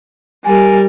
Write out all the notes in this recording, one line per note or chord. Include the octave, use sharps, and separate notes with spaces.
G3 A#4 G#5